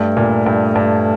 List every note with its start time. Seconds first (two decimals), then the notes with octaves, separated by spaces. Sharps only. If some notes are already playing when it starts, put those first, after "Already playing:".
Already playing: G2 A3
0.17 A#2
0.46 G2
0.75 G2